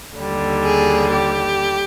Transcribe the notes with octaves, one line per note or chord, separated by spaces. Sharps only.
D#2 D3 G3
G#4
G4